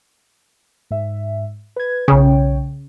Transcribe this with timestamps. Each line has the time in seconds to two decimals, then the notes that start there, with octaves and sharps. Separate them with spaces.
0.91 G#2 E5
1.76 B4 G#6
2.08 B1 C#3 C#5 G5